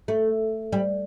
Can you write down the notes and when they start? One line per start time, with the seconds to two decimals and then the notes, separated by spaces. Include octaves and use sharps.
0.08 A3
0.72 G3